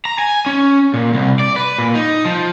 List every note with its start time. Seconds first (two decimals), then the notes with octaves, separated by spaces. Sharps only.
0.05 A#5
0.19 G#5
0.46 C#4
0.94 A#2
1.14 C2
1.39 D5
1.56 B4
1.79 A#2
1.95 D#4
2.25 F3